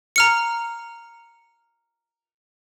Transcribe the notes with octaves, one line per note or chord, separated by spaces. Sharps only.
A#5 F6 C#7